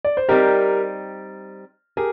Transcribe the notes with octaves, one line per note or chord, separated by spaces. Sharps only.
D5
C5
G3 C4 D#4 G4 A#4
G4 G#4 A#4